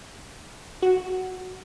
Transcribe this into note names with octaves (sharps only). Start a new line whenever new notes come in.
F#4